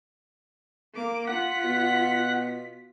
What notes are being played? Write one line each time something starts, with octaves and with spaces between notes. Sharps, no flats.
A#3 D6
F4 F#5 B6
B2